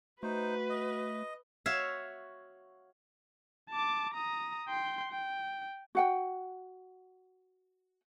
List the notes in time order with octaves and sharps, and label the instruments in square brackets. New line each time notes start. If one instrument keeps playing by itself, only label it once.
[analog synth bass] A3 [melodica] D#4 C5 [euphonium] F#4 [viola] B4
[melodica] D#5
[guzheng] F#4 C#5 E5 F5
[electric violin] A5 D6
A#5 D#6
G5 C6
G5
[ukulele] F#4 F#5 G5